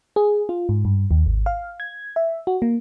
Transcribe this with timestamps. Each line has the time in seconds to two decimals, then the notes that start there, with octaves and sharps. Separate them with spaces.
0.16 G#4
0.49 F4
0.69 G#2
0.85 G2
1.11 D#2
1.26 G#1
1.46 F5
1.80 G#6
2.16 E5
2.47 F#4
2.62 A#3